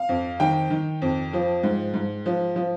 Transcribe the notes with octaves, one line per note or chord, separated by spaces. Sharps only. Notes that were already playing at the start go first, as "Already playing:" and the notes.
Already playing: F5
F2
D#3 G5
D#3
F2
F3
G#2
G#2
F3
F3